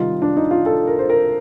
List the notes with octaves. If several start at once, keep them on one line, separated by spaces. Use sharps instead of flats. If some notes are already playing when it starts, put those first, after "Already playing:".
Already playing: C3 D#3 G3 D#4 F4
D4
D#4
F4
A4
A#4
C5
A#4